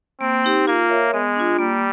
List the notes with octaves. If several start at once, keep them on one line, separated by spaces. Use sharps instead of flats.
A#3 C4
D#4 G4
A#3 F4
A#4 C#5 E5
G#3 B3
D4 F4
G3 A#3